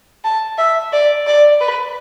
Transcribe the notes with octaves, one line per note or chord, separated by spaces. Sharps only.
A5
E5
D5
D5
B4